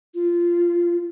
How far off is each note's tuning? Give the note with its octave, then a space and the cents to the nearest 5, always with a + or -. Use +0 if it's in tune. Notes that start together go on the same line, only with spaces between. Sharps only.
F4 -15